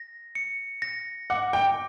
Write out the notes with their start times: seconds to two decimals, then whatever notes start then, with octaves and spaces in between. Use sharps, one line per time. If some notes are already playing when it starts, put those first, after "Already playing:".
Already playing: A#6
0.35 C#7
0.82 A#6
1.30 F#5 D6
1.53 G5